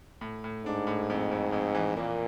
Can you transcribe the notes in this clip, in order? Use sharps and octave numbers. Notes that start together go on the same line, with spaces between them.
A2
A2
G#2 D4
A2
F2
F2
F2
E3
A#2 A#3